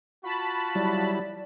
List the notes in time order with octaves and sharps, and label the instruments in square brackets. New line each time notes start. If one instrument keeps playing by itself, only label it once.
[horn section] F4 F#4 [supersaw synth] A5 B5
[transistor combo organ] F#3 G3 E4 [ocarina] D5